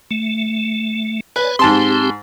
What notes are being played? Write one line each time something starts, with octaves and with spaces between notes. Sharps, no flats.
A3
B4 C#5 D5 G#5
G#2 C4 G4 A5 C6